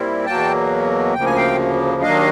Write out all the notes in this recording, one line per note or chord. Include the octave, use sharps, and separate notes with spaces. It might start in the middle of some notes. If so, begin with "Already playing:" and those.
Already playing: A#2 G3 C4 E4
E2 B2 F#3 A#3 G5 A5
D2 C#3 F3 A#3 G5
G#5
F5 G5
D#2 D#3 F#3 A#3 D4 D#5 F5